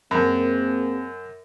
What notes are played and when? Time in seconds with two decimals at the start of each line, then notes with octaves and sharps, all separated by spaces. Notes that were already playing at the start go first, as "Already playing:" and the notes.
0.11 F#2 A#3 C4 G#4